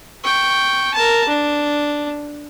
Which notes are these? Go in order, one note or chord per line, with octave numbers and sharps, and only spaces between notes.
G5 C#6
A#4 A5
D4